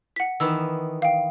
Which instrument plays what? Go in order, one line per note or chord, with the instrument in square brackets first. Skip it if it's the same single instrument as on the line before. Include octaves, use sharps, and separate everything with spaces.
[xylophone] F#5 B6
[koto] D#3 E3 B3 [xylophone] E6
[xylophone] F5 G5